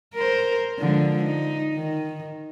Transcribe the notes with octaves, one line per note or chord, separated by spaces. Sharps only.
A#4 C5
D3 F3 G#3
D#4
D#3